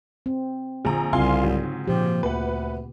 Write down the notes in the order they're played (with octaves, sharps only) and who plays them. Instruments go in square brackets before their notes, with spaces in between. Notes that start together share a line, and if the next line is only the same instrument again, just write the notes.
[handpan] C4
[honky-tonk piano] A#1 F3 A#5 [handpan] D3 G#4
[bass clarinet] C2 [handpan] C#3 C4 F4 [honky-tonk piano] F5 G#5 C6
[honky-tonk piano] G#2 F#3
[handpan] A#2 G4 [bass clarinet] F3
[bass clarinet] D2 [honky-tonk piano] B4 F#5